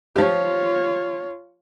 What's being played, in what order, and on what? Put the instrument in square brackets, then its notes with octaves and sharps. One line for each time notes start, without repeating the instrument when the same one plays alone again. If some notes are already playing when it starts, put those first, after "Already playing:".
[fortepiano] F3 G4 [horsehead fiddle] F4 C#5